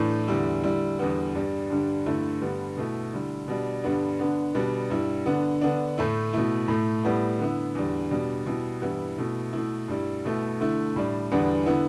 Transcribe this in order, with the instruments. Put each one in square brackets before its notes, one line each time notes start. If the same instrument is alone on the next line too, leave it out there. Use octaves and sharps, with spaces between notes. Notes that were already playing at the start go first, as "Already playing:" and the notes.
Already playing: [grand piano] A2 E3 A3 D4
E2 D3 G3 E4
D3 G3 E4
E2 D3 G3 B3
G2 G3 D4
G2 D3 G3 D4
G2 D3 A3 E4
G2 D3 G3 B3
B2 A3 E4
D3 G3 E4
B2 G3 D4
G2 D3 G3 B3 D4
D3 B3 D4
B2 G3 B3 D4
G2 G3 E4
D3 B3 D4
D3 B3 D4
A2 A3 E4
B2 A3 E4
A2 A3 E4
A2 G3 B3 E4
D3 B3 E4
E2 D3 G3
B2 G3 D4
B2 G3 E4
G2 E3 G3 B3 E4
B2 A3 E4
B2 A3 E4
G2 G3 E4
B2 A3 E4
D3 A3 E4
A2 G3 D4
E2 D3 G3 B3 D4
D3 B3 E4